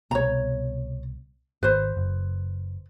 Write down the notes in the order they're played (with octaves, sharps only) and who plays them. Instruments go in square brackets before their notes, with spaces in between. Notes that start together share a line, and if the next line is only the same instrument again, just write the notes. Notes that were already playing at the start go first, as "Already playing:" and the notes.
[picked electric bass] C2 B2 B3 [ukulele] C#5 A#5
[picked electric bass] G#1 [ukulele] B4 C5
[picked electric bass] F#1